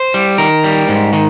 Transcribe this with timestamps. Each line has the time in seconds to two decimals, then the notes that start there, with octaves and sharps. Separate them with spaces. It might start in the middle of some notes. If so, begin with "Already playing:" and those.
Already playing: C5
0.14 G3
0.38 D#3 A#4
0.64 G3
0.88 G#2
1.13 D#3